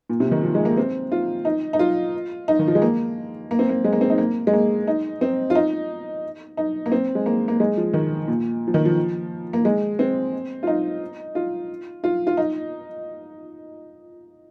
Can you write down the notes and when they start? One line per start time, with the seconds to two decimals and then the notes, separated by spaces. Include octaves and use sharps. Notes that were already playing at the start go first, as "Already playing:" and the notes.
0.10 A#2
0.20 C3
0.31 D#3
0.43 F3
0.55 G#3
0.65 A#3
0.77 C4
1.12 F4
1.45 D#4
1.73 D#4
1.79 F4
2.48 D#4
2.59 D#3
2.68 F3
2.75 G#3
2.82 A#3
3.51 A#3
3.59 C4
3.69 A#3
3.84 G#3
3.93 A#3
4.01 C4
4.10 D#4
4.18 A#3
4.47 G#3
4.53 A#3
4.87 D#4
5.21 C4
5.50 F4
5.55 D#4
6.57 D#4
6.86 A#3
6.92 C4
7.15 G#3
7.26 A#3
7.48 A#3
7.60 G#3
7.77 F3
7.94 D#3
8.28 A#2
8.67 F3
8.74 D#3
8.85 F3
9.53 A#3
9.65 G#3
9.99 C4
10.63 F4
10.67 D#4
11.35 F4
12.04 F4
12.27 F4
12.37 D#4